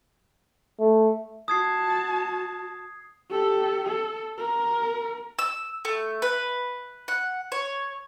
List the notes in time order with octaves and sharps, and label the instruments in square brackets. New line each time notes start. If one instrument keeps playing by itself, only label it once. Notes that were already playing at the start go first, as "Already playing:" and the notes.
[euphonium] A3
[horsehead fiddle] F#4 A5 [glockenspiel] D#6 G#6 C7
[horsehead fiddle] G4 A4
A4
A#4
[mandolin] E6
A3
B4
F#5
C#5